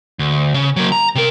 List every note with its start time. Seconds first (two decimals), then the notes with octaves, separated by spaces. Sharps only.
0.19 D2
0.54 C#3
0.76 F#3 A#3
0.92 A#5
1.15 C3 A#4